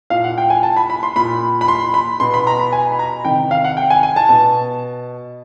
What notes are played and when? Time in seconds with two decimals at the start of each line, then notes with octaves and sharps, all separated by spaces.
0.10 A#2 F5
0.24 F#5
0.38 G5
0.50 G#5
0.63 A5
0.76 B5
0.90 B5
1.03 C6
1.16 A#2 B5
1.61 B5
1.68 C6
1.94 B5
2.20 B2 C6
2.34 B5
2.47 A#5
2.59 B5
2.72 G#5
2.92 B5
2.99 A#5
3.24 C3 D#3 G5
3.51 F5
3.64 F#5
3.77 G5
3.90 G#5
4.03 G#5
4.16 A5
4.29 B2 A5